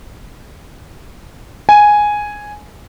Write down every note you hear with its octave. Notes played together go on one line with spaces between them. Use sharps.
G#5